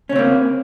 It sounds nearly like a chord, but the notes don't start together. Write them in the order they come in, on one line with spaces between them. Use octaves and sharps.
C#4 C#3 C4 A#3